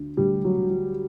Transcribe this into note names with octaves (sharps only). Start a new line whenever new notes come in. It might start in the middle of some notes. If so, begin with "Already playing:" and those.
Already playing: D2 D3
D2 G3
F#3
D3
F#3